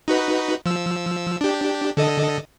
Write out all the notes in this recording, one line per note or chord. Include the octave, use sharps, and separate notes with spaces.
D#4 F#4 B4
F3 E6
D4 G4
D3 A4 D#5